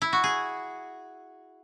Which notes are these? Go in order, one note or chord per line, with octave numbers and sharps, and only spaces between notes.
E4
F#4
G#4